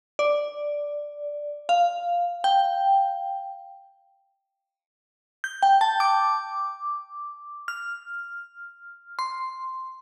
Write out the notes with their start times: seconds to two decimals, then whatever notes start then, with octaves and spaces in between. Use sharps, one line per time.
0.19 D5
1.69 F5
2.44 G5
5.44 G6
5.63 G5
5.81 A5
6.00 D6
7.68 F6
9.19 C6